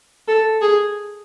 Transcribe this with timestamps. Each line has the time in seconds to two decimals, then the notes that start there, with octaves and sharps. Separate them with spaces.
0.28 A4
0.61 G#4